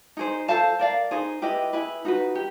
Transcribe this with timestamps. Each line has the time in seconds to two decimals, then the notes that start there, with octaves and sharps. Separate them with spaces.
0.17 D#4 G#4 C5
0.48 A4 C5 F5 A5
0.79 A#4 D5 F5
1.11 D#4 G#4 C5
1.42 E4 G4 B4 D#5
1.73 E4 G#4 B4
2.05 D#4 F#4 B4
2.35 G4